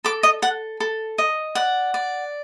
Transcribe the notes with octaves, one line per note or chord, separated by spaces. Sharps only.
A4 D6
D#5
A4 F#5
A4
D#5
D5 F#5
D5